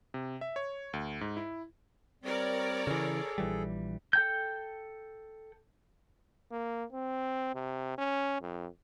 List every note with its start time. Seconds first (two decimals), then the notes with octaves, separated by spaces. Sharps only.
0.14 C3
0.41 E5
0.56 C#5
0.93 D2
1.21 G#2
1.37 E4
2.24 G3 C4 A#4 C#5 D5
2.87 C#3 E3 G#4 A4
3.38 A#1 E3 G3
4.13 A4 G5 G6
6.51 A#3
6.93 C4
7.55 C3
7.98 C#4
8.42 F2